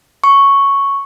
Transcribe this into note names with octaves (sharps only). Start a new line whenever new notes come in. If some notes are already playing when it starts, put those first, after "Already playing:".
C#6